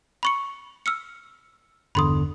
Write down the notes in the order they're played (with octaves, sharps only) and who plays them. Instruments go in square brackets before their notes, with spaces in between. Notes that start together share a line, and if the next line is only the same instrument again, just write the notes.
[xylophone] B5 C#6 C#7
E6 F6 C#7
[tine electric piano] G1 E2 D3 [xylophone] B5 C6 D#6